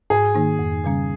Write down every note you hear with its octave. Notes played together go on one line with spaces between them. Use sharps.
G#2 G#4
D#3 A#3 D#4
F2
C#3 G3 C#4